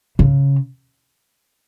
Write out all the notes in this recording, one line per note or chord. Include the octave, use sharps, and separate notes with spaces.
C#3